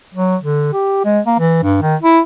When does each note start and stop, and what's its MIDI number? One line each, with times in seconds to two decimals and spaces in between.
0.15 0.36 54
0.42 0.70 50
0.73 1.02 67
1.05 1.20 56
1.26 1.38 58
1.39 1.61 52
1.63 1.81 43
1.82 1.96 51
2.03 2.20 64